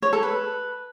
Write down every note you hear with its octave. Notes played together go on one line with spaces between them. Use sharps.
C#5
A4
B4